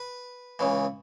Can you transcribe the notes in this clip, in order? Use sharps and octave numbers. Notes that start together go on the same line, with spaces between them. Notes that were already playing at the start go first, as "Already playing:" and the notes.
Already playing: B4
C#2 C#3 E3